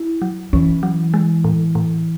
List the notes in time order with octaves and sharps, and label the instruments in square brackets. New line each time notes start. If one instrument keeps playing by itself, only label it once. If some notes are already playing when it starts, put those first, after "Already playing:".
Already playing: [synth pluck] E4
F#3
[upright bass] E3 [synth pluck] C#4
[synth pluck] F#3
G#3
A2
A2